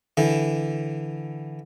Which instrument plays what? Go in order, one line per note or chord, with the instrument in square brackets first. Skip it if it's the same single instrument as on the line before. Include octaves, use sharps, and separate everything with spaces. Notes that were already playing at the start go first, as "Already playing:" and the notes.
[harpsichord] D3 E3